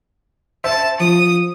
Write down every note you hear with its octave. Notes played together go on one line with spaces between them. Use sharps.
C5 E5 A5
F3 D#6